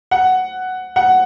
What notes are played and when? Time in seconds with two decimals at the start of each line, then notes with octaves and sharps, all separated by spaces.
0.11 F#5
0.96 F#5